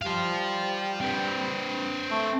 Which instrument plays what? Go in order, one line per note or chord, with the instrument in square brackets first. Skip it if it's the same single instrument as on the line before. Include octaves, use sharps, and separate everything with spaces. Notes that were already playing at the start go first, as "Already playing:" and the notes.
[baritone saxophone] G3 [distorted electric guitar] C5 F5
[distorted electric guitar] C4 B4
[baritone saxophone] A3